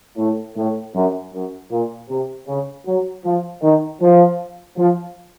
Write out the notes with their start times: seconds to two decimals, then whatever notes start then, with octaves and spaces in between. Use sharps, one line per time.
0.17 A2
0.56 A2
0.95 F#2
1.33 F#2
1.71 A#2
2.09 C3
2.48 C#3
2.87 F#3
3.25 F3
3.62 D#3
4.01 F3
4.78 F3